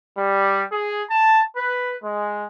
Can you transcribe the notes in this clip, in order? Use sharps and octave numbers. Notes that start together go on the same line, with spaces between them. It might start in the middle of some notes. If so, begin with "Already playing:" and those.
G3
G#4
A5
B4
G#3